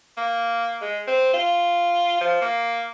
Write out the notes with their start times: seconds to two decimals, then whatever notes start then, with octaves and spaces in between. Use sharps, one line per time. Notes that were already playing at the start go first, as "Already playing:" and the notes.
0.17 A#3
0.81 G#3
1.07 C4
1.34 F4
2.21 F3
2.42 A#3